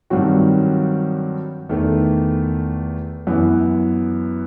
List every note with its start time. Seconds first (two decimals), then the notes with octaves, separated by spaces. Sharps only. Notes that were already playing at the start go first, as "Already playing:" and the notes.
0.10 G2 D#3 F#3 C4 F#4
1.69 E2 D#3 A3
3.27 F#2 E3 B3